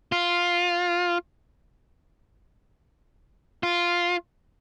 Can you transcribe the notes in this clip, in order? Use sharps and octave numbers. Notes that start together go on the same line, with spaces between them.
F4
F4